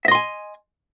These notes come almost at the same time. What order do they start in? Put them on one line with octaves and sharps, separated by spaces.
E5 D#5 C6 G#5